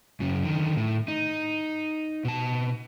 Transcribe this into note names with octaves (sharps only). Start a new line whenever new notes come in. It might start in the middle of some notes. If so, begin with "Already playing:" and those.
F#2 C#3
D3 D#3
A2
D#4
B2 A5